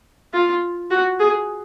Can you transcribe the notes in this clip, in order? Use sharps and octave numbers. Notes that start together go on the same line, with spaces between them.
F4
F#4
G#4